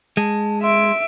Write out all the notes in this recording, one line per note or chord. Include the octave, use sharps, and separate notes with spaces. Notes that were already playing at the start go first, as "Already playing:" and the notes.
G#3 A5
E5 C6 D7